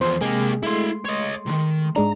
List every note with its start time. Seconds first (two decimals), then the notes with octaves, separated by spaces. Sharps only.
0.01 E2 F3 C5 C6
0.21 C3 G#3 A#3 G4 G#4
0.63 G#3 A3 E4 F5 C6
1.05 C#5 D#5
1.47 C2 D#3
1.96 G#2 G#3 D4 A#5